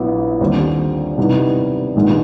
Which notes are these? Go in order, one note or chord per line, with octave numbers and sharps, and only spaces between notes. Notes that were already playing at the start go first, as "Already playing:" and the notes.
Already playing: A#1 F#3 B3 E4
D#2 D3 G3 C4
C3 E3 G3 B3 D#4
A#1 G#2 D#3 G#3 B3